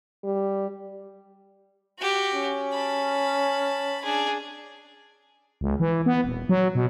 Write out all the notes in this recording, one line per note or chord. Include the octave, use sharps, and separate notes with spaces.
G3
F#4 G4
C#4
A5 B5
D4 G#4
C#2
E3
B3
D#1
F#3
B2